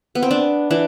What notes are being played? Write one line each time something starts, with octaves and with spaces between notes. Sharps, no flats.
B3
C4
B3 D4
E3 D4